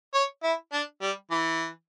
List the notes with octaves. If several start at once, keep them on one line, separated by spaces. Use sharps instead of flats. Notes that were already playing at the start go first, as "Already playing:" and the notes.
C#5
E4
D4
G3
E3